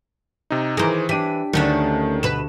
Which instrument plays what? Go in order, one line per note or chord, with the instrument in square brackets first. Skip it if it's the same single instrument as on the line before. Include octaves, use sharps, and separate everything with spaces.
[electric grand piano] C3 D#4
[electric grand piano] D#3 E3 G#4 [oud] A#4 C5 [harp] D6
[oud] E3 [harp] D4 G4 [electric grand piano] B6 D#7
[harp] D2 [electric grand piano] D#3 [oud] A3 C#4 D4
[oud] B2 B4 [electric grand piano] E7